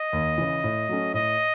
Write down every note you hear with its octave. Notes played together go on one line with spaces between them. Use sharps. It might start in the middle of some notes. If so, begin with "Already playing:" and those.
Already playing: D#5
D#2
C#3 E3
A2
F#3 A3 C#4
A2 D#5